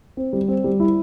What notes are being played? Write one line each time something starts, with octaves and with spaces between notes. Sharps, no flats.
C4
G3
C4
G3
E4